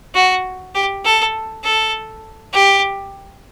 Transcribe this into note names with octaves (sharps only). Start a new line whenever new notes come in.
F#4
G4
A4
A4
G4